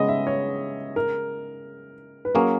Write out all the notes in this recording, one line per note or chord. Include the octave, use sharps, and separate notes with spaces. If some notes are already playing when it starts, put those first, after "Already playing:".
Already playing: C#3 G#3 B3 D#5
E5
C#5
A#4
B4
F#3 A#3 C#4 G#4 A#4